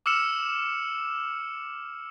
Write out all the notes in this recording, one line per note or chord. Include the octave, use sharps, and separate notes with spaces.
D6 E6 F6 C#7 E7